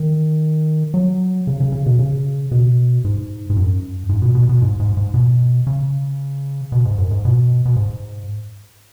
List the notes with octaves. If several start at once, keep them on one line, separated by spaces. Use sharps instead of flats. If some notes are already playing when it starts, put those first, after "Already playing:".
Already playing: D#3
F#3
C#3
C#3
C#3
B2
C#3
B2
G#2
G#2
F#2
G#2
B2
B2
B2
G#2
G#2
G#2
B2
C#3
B2
G#2
F#2
G#2
B2
B2
G#2